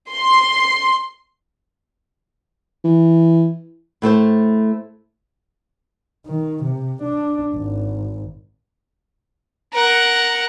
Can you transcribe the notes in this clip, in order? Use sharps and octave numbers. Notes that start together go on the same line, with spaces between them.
C6
E3
A2 A3 A4 C5
D#3
C3
D4
G#1
A#4 F#5